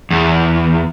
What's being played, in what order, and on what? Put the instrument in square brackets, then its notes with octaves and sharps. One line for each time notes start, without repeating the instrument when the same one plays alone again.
[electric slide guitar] E2